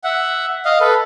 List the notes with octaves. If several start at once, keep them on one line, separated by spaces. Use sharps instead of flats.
E5 F#5
D#5 F5
A4 B4